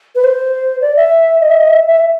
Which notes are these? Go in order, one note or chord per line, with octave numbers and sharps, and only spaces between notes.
B4
C5
D5
E5
D#5
E5
D#5
E5
E5